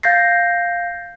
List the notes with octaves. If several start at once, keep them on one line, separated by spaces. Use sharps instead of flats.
F5 G6 A6 A#6 C7